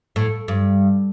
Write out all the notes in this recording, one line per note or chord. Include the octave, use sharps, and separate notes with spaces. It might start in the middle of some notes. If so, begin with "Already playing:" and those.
A2
G2